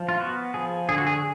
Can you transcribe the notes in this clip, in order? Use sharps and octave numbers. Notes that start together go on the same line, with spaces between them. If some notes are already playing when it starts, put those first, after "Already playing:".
Already playing: F3
F4
B3 F#4
F3 G#4
D3 G#4
F#4
G#4